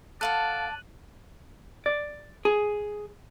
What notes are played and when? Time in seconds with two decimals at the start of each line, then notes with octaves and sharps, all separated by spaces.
0.21 A4 D5 F5 F#5 A5 F#6 D#7 F#7
1.86 D5
2.45 G#4